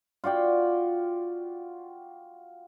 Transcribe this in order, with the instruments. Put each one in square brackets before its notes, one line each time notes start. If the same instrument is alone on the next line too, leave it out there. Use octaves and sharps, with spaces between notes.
[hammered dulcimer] F4 F#4 D5 G5